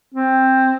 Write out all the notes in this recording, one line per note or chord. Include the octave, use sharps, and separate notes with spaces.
C4